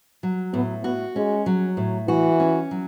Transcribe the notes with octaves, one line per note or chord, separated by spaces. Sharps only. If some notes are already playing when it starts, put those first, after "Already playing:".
F#3
A2 B3
B3 F#4
G#3 C#4
F#3
A2
E3 F#4
C#4
F#3